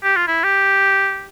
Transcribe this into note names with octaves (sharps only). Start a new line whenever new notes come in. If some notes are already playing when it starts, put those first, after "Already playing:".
G4
F4
E4
G4